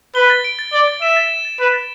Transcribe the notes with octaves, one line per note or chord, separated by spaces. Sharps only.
B4 G7
A6
D7
A6
D5 G7
A6
E5 E7
A6
G7
A6
B4 E7
A6